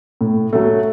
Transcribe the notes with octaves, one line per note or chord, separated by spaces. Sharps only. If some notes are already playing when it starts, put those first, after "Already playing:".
A2
F#3 A3